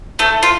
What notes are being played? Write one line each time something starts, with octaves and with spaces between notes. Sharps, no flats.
A3 A4
F4